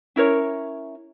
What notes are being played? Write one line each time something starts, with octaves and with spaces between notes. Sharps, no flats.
C#4 E4 A#4 C#5